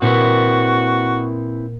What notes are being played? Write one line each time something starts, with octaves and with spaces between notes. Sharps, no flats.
A#2 C4 E4 F#4 B4